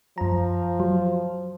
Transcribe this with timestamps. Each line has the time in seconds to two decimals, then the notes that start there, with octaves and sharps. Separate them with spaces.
0.18 F#2 F3 A#5
0.80 F#3